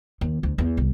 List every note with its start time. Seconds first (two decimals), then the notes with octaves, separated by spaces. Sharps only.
0.21 D#2
0.43 D2
0.58 E2
0.77 C2